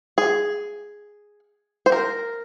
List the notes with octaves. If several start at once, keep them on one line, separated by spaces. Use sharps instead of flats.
G#4
C5
A#4